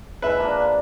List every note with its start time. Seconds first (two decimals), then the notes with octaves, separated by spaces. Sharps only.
0.22 G#3 B4 E5
0.36 F3 A#3 D4